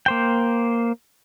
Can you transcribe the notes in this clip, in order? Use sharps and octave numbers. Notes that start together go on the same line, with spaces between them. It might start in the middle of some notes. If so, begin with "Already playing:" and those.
A#3 C5 G5